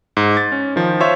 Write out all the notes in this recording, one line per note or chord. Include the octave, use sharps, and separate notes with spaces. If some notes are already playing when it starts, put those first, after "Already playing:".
G#2
A6
C#4
D#3 F3
F4 C5 C#5 E5